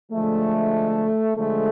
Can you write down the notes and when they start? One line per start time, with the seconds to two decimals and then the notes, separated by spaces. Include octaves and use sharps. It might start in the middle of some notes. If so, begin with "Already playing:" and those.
0.11 D3 F3 G#3 A3
1.36 D3 F3 G#3 A3